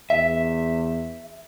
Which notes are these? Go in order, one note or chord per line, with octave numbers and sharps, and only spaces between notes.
E2 E5